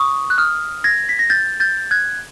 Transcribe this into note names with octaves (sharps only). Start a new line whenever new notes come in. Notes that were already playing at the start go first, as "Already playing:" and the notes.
Already playing: C#6 D#6
F#6
D#6 F6
G#6 A#6
B6
A#6
G6 A6
G6 A6
F#6 G#6